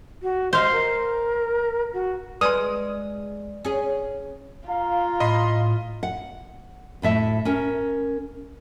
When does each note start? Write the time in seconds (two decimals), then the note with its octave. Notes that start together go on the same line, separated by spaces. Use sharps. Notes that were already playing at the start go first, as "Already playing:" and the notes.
0.22 F#4
0.53 C5 D#5 F5
0.72 A#4
1.93 F#4
2.41 G#3 B4 D5 C6 D#6
3.65 C#4 G#4
4.69 F4 F5 A#5
5.20 A2 D#5 B5 C6
6.03 F#5
7.02 D2 A2 E5 A5
7.45 C#4 A#4